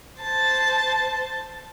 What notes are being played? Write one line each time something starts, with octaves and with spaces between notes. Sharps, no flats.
C5 A5